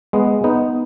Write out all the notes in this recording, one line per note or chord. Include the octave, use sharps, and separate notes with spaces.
G#3 B3
B3 D#4